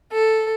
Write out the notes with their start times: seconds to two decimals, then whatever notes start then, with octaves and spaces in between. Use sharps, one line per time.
0.14 A4